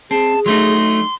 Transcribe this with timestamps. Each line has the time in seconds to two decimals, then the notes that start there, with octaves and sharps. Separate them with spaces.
0.11 C4 G#4 A5
0.46 F#3 A3 D#4 C6